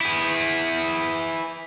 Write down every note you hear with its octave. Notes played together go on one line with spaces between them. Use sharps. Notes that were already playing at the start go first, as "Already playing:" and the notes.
E4 G#4